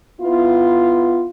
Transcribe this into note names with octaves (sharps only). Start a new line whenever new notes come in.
B3 E4 F4